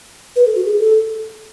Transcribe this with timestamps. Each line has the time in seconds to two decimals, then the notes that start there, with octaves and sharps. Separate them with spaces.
0.36 B4
0.46 A4
0.56 F#4
0.66 G#4
0.80 A4